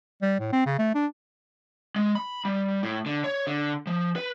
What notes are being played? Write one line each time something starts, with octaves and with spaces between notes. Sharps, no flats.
G3
A2
C4
C#3
A3
D4
G#3
B5
G3
A2
D3
C#5
D3
F3
B4